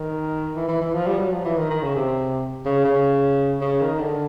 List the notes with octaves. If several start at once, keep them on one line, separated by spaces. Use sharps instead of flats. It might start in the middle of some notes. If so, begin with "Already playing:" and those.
Already playing: D#3
E3
E3
E3
F3
G3
F#3
F3
E3
D#3
D#3
C#3
C3
C#3
C#3
C#3
D#3
D3